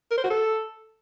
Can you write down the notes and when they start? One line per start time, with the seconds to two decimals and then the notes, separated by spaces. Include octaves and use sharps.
0.11 A#4
0.18 C5
0.24 F#4
0.30 A4